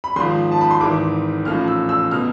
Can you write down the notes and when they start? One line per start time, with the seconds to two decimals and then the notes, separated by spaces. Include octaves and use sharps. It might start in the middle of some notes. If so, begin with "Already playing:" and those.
0.04 B5
0.16 G#1 G#2 F3 C6
0.51 A5
0.61 B5
0.71 C6
0.81 G#1 G#2 E3 D6
1.45 A1 A2 F3 F6
1.68 E6
1.89 E6
2.11 B2 F6